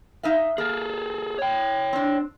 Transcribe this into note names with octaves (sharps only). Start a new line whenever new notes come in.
D#4 E5 F5
A#3 G#4 A4
C#5 G5
C4 D4